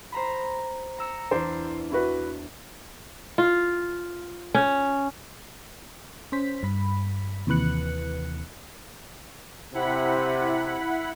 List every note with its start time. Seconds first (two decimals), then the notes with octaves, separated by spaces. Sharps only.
0.12 C5 A#5 B5
0.98 A#5 E6 C#7
1.31 E2 D4 C5
1.91 E4 F#4 B4
3.38 F4
4.55 C#4
6.32 C#4 C5 B6
6.63 G2 B5 B6
7.47 D#2 C3 E3 B4 F#6 C#7
9.74 C3 E4 F#5 B5